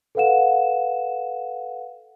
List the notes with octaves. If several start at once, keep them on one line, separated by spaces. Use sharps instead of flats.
A4 B4 F5 F#5 E7